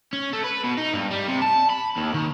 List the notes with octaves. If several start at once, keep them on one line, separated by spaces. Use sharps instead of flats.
C#4
A3
B4
B2
D#4
G2
G3
C3
A5
B5
D#2
D#3